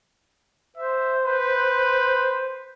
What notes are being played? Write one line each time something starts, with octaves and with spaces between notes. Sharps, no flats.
C5 E5
B4